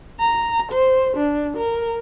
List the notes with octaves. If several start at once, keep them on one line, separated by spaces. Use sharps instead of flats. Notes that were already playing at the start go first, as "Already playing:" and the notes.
A#5
C5
D4
A#4